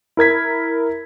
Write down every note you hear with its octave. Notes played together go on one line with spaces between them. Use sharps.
E4 A#4 G#6 B6